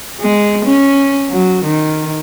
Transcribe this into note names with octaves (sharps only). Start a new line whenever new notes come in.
G#3
C#4
F#3
D#3